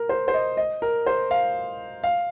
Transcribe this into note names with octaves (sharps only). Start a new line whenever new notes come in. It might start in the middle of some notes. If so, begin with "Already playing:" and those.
Already playing: A#4
C5
C5
D#5
D#5
A#4
C5
F5
F5